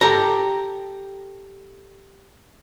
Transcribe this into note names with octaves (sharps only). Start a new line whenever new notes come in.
G4 A4 A#5